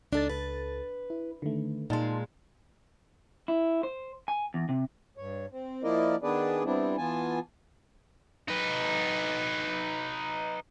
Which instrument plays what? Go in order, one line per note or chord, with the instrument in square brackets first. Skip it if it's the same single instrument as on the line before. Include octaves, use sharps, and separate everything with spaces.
[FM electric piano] C#2 A4 A6 [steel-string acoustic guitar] D4 D#4
[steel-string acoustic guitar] B4
[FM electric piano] E4
D3 D#3 A3
[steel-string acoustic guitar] A#2 G#3 [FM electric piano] D#4 A5 C6
[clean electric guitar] E4
C5
G#5
E2
C3
[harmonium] G2 C#5
C4
F3 A#3 E4 A#4 D5 D#5
D#3 B3 D4 G#4 B4 D5
G3 B3 C4 D4 E4
E3 B3 F4 G#5 A5
[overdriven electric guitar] D#4 B4